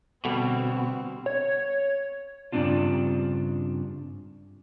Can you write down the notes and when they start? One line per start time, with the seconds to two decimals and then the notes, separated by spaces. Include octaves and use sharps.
0.25 B2 D3 G3 C4
1.26 C#5
2.52 G2 C#3 G3 C4 D4 F4